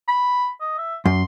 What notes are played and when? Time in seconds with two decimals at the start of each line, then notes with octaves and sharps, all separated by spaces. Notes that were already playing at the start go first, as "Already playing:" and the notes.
0.08 B5
0.61 D#5
0.78 E5
1.06 F#2 C6